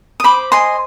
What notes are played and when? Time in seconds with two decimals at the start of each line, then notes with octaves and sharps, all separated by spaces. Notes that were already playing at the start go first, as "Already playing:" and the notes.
0.20 D#6
0.24 C5 B5 D6
0.52 D#5 G#5 C6